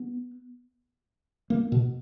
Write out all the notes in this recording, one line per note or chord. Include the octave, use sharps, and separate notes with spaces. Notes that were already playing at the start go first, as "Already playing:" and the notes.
Already playing: B3
A#3
B2